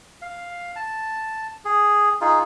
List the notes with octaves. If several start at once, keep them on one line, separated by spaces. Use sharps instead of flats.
F5
A5
G#4
D#4 F4 G#4